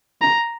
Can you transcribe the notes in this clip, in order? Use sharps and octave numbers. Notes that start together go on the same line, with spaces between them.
A#5